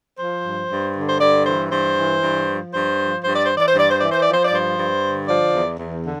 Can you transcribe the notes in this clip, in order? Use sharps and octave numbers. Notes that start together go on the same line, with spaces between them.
F3 C5
G2
G2
D3
C5
G2 D5
E3 C5
G2 C5
E3
G2
F3
G2 C5
F3
G2 C5
D5
E3 C5
D5
C5
G2 D5
C5
E3 D5
C5
F3 D5
C5
D5
G2 C5
G2
D3
F3 D5
E2
E2
D3